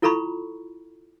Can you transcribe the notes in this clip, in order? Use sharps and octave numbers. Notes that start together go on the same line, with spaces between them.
E4 F4 A4 A#5 B5 C#6